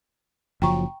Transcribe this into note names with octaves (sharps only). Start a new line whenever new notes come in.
F#1 F3 F#3 G5 A#5 C#6